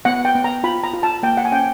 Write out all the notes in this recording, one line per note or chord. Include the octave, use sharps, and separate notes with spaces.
B3 F#5
G5
B3
A#5
F4 B5
A#5
F4
A5
A#3 G5
F#5
G#5
C#4 G5